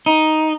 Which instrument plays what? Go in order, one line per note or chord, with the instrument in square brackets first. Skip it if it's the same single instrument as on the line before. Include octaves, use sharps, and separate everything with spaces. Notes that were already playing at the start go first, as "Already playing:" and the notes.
[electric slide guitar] D#4